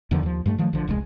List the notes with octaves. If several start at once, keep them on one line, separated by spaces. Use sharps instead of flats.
E2 D3 D#3 F3
D#2 F3
G2 G3 A3
D#3 F3 F#3 A3
A#1 D3 F3
E1 C2 B2 G#3